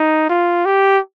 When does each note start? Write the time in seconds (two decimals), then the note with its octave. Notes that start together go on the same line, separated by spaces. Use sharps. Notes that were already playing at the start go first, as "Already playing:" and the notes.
Already playing: D#4
0.29 F4
0.66 G4